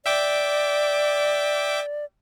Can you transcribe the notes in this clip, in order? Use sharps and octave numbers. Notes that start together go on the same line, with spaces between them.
D5 E5 G5 D6